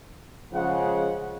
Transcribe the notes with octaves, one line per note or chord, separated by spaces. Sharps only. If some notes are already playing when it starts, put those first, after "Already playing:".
C#3 F3 G#3 F#5